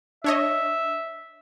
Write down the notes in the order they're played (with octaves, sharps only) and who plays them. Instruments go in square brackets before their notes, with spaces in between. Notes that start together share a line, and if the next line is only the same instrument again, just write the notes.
[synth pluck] D4 C#5 D#5 [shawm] E5